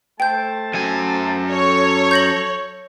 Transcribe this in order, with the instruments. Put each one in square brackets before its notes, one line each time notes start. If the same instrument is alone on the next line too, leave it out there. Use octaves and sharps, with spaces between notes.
[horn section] A3 C5 A5 [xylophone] G5 G6
[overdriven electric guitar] F#2 G#5
[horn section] A4 [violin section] C#5
[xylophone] G6 A#6 F#7